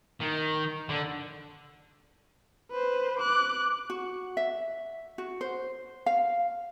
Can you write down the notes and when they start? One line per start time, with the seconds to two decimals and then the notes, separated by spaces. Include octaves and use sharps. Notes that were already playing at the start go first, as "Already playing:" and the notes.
0.21 D#3
0.89 D3
2.71 B4 C5
3.20 D6 F#6
3.90 F#4
4.37 E5
5.18 F#4
5.41 C5
6.06 F5